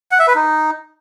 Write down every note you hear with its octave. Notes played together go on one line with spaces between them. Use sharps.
F#5
E5
B4
D#4